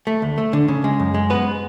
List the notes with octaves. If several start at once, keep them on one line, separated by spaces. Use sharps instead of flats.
A3
D2
A3
D3
C#3
G#3
F#2
G#3
B3 B4